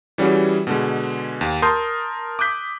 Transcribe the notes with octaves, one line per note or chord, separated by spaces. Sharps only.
E3 G3 C#4 F#4 G#4
B2 D3 G#3
D#2
A#4 A5 C6 D#6 G6
D6 D#6 F#6 G6 B6